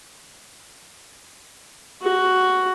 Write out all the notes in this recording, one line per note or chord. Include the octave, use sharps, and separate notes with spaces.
F#4